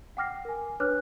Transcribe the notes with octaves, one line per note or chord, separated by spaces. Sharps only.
F#5 G5 D6 F6 A#6 C7
A#4 G#5
D4 B4 C#5 D6 F6 F#6